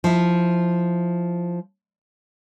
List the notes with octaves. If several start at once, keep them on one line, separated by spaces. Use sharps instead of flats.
F3 E4